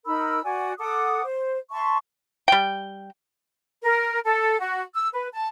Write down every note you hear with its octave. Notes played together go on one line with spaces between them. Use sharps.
D#4 A#4 B5 E6
F#4 D5 G#5
A4 F#5 D6 D#6
C5
E5 A5 C6 C#6
G3 G5
A#4
A4
F#4
E6
B4
A5